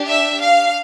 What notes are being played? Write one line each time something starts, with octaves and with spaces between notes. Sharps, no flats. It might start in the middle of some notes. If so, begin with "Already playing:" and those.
Already playing: D4 G4
E5
F5